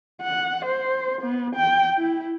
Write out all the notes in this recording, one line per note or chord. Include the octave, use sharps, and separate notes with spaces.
F#5
C5
B3
G5
E4